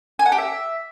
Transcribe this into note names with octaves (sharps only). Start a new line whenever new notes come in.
G#5
F#5
G4
E5